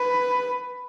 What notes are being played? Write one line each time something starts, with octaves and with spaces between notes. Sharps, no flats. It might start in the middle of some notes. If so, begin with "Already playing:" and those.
Already playing: B4